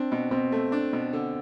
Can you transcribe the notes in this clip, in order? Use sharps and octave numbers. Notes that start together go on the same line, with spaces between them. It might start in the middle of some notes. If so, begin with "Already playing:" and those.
Already playing: C4 D4
B2
B2 C4
A3
D4
B2
D3